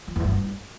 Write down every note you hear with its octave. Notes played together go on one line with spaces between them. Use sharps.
F3
E2
G2